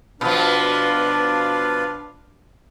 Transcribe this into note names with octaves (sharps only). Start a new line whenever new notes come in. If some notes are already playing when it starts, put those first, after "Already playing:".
B2 F3 D4 F4 B4 F5